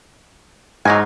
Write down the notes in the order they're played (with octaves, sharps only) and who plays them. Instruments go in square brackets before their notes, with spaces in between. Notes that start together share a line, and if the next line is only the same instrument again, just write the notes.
[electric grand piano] G#2 [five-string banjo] F#3 D#5 G#5